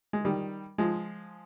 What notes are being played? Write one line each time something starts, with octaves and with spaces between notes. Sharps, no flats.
G#3
D#3 G3
F3 G#3